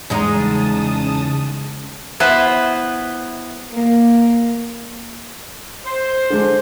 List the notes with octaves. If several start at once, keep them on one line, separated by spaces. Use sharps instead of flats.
E2 C#3 G#3 D#4 A5 D#6
B3 E4 B4 C5
A#3
C5
D3 G#3 D4